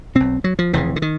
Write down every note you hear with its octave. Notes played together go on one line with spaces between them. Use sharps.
B1 B2 C4
F#3
F3
F1 F2 C#3 E3
D3
D#3